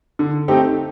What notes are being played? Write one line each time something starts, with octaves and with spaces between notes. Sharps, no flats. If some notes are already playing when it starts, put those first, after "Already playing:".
D3
A3 C4 D#4 G4